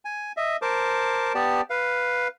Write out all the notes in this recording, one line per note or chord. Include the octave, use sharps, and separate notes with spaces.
G#5
D#5 E5
A#4 C5 A5 D6
B3 G4 D5 A5
B4 F5